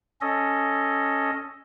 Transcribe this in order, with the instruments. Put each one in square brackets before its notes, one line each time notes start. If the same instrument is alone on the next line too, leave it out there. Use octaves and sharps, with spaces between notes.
[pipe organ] C#4 A4 D#5